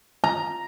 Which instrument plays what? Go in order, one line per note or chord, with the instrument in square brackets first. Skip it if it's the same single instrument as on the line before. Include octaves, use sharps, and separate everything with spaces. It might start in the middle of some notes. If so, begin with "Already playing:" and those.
[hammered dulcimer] A#5